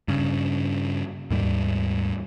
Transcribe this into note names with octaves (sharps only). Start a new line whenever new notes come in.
G2 C#3
D#2 G#2 G3